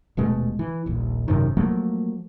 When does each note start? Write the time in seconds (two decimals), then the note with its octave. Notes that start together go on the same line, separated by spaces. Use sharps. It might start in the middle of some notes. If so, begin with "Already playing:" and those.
0.17 D#1 B2 G#3 A3
0.59 E3
0.86 D#1 A#1
1.28 G#1 F#2 C3 D#3
1.57 F3 F#3 A3 A#3